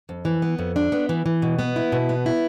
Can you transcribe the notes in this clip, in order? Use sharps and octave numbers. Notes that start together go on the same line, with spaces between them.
F2
E3
B3
F2
D4
B3
E3
E3
B2
B3
E4
B2
B3
E4